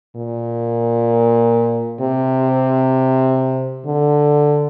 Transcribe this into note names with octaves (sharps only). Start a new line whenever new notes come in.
A#2
C3
D3